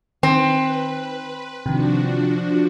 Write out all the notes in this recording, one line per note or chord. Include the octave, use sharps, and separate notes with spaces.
D#3 C4 B4
C3 D#3 F3 D4 F#4